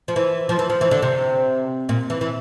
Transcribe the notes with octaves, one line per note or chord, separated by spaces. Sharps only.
F3
E3
F3
E3
F3
E3
D3
C3
A#2
E3
E3